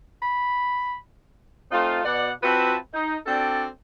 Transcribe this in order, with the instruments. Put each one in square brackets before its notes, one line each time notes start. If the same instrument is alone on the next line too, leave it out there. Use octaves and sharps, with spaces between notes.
[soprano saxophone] B5
[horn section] A3 C4 D#4 F4
B2 D5 F#5
C4 F4 F#4 B4 E5 A5
D#4
C4 D4 F#4 A4 D5 G5